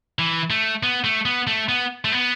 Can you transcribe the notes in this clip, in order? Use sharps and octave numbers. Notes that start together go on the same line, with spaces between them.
E3
A3
B3
A3
B3
A3
B3
A3
B3